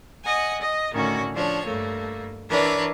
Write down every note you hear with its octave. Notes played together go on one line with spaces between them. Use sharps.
D#5 F#5 G#5
D#5
A2 D3 D#3 C#4 F#4
F3 D4 C#5
G2 A3 A#3
E3 D4 A#4 B4 C#5